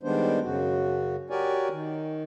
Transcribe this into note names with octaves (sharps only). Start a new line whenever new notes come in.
D#3 G3 G#3 B3 D4 C5
F#2 C#3 F#4
F#4 G4 A#4 C#5 D5 G#5
D#3